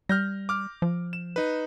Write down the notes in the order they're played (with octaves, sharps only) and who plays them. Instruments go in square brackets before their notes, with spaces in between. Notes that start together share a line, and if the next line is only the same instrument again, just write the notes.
[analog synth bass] G3 [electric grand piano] F6 G6 A#6
[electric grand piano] D6 F6
[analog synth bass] F3
[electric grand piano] E7
D#4 B4